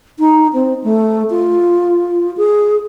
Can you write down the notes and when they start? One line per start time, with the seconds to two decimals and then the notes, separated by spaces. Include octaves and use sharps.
0.19 D#4
0.53 C4
0.84 A3
1.30 F4
2.37 G#4